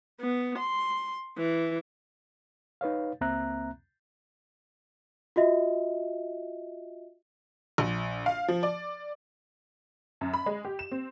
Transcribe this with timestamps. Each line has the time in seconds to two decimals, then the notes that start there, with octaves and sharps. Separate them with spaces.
0.21 B3
0.59 C6
1.37 E3
2.81 D#4 B4 C#5 F5
3.21 C#2 A#3 C4 E5 A#5 F#6
5.36 F4 F#4 D#5 E5
7.78 A#1
8.26 F5
8.48 F3
8.63 D5
10.21 F#2
10.34 B5
10.46 G#3
10.65 G4
10.79 E7
10.91 C4